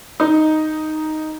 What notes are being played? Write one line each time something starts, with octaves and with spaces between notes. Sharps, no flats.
D#4